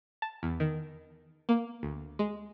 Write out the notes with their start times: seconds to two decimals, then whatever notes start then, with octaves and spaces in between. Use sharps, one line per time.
0.22 A5
0.43 E2
0.60 D#3
1.49 A#3
1.83 D2
2.19 G#3